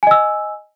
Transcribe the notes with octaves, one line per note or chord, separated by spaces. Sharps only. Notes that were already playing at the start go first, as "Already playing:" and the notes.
D#5 G#5 E6